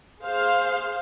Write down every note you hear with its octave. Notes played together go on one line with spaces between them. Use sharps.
G#4 C5 F5